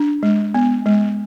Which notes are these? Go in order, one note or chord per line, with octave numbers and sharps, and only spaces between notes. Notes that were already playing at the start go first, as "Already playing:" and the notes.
Already playing: D4
G#3
B3
G#3